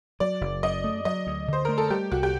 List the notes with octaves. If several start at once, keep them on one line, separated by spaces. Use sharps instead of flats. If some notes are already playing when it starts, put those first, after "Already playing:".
F#3 D5
F#1
F#2 D#5
A3
F#3 D#5
D2
D3 C5
A3 A#4
A4
G3 G4
C2 F#4
G4